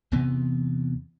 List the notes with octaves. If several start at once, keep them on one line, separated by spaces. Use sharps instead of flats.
E2 C3 E3 B3